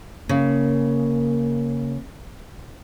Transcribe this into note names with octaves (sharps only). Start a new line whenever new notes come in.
C#3 A#3